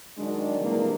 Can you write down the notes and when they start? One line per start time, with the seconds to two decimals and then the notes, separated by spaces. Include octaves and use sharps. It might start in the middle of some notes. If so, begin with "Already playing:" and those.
0.18 D#3 F#3 G#3 D4
0.61 C3 E3 G3 G#3 A#3 D4